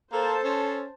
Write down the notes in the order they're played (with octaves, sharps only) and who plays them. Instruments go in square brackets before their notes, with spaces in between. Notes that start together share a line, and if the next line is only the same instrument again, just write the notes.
[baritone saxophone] A#3 [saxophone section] A4 [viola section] C5 A5
[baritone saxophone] C#4